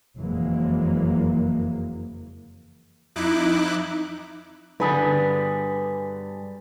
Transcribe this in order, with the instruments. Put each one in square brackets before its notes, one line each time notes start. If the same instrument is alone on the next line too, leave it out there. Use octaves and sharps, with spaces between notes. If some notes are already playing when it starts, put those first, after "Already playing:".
[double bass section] F#1 F2 E3 F#3 G#3 A#3
[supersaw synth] F2 D#4 E4 D6 F#6
[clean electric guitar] G2 G3 G#4 [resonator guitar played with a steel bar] D3 B3 D4 [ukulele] B4